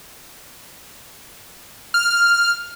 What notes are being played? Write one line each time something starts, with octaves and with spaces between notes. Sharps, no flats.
F6